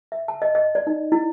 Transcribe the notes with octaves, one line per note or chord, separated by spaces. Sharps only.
E5
A5
D#5
D#5
D5
D#4
E4